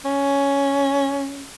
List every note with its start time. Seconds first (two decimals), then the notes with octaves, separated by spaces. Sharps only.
0.05 C#4